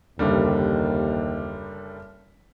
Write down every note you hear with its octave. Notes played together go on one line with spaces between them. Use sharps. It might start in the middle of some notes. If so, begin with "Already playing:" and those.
F#1 D#2 D3 G3